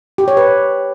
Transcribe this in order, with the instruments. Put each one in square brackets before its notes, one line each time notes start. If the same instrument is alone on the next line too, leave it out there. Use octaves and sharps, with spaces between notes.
[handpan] G4
C#5
B4